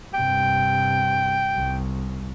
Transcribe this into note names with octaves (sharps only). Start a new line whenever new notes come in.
G2 C3 G5
C2